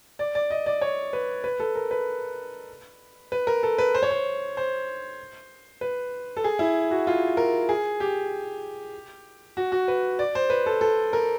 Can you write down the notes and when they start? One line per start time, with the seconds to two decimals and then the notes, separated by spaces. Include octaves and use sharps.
0.19 D5
0.35 D5
0.50 D#5
0.66 D5
0.81 C#5
1.13 B4
1.44 B4
1.60 A4
1.75 A#4
1.91 B4
3.32 B4
3.47 A#4
3.63 A4
3.78 B4
3.95 C5
4.03 C#5
4.11 C5
4.57 C5
5.81 B4
6.37 A4
6.44 G#4
6.59 E4
6.91 F#4
7.07 F4
7.37 A#4
7.69 G#4
8.00 G4
9.57 F#4
9.72 F#4
9.88 B4
10.19 D5
10.35 C5
10.50 B4
10.66 A4
10.81 A4
11.13 A#4